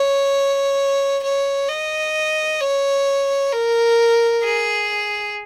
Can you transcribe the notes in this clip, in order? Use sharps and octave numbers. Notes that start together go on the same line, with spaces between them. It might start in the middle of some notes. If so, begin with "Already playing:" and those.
Already playing: C#5
C#5
D#5
C#5
A#4
G#4